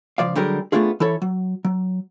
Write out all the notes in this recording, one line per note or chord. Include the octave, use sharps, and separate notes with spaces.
C#2 F3 D5 F5
D3 F#3 G3 G4 G#4 A#4
A3 B3 C4 D4 F4 G#4
E3 E4 A4 C#5
F#3
F#3